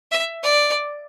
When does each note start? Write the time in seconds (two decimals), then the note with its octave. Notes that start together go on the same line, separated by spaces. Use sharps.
0.12 E5
0.43 D5